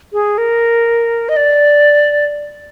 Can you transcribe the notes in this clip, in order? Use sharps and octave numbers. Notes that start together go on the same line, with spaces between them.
G#4
A#4
D#5
D5